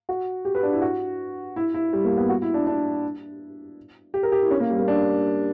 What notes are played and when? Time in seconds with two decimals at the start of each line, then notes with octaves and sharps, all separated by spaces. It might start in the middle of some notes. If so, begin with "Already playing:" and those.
0.09 F#4
0.45 G4
0.55 B4
0.63 D4
0.73 E4
0.82 F#4
1.56 E4
1.74 E4
1.93 G3
2.05 A#3
2.17 B3
2.29 F#4
2.42 E4
2.54 D4
2.67 D4
4.14 G4
4.23 A#4
4.32 G4
4.42 E4
4.51 C#4
4.60 A#3
4.70 G3
4.79 A#3
4.88 D4